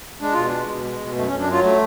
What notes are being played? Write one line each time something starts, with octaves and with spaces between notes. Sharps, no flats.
G#3 D4
B2 F4
D4
G#3
B2
G#3
B2
F#2 A3
C#4
F#2
D4
F#3 F4
A3